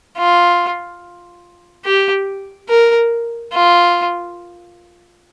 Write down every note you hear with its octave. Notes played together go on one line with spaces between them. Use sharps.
F4
G4
A#4
F4